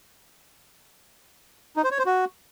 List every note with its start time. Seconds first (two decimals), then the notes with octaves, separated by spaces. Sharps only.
1.77 D#4
1.84 C5
1.91 C#5
1.98 C5
2.06 F#4